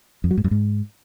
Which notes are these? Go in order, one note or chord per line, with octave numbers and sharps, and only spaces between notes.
F2
F#3
G#2
F#2
G#2